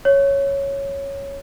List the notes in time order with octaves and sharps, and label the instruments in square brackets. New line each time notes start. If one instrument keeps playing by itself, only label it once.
[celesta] C#5